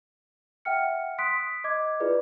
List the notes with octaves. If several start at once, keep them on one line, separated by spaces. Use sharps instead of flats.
E5 F#5 G5 F6 C#7
C6 D#6 F#6 B6 D7
D#5 D6 G#6
E4 F4 G#4 B4 D5